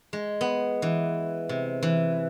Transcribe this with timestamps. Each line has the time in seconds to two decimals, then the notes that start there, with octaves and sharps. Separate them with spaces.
0.13 G#3
0.41 B3
0.82 E3
1.49 C3
1.83 E3